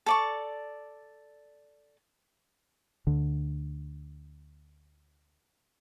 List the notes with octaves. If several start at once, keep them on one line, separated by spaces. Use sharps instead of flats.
A4 D5 C#6
D2 D3